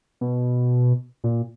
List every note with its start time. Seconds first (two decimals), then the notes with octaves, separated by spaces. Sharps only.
0.21 B2
1.24 A#2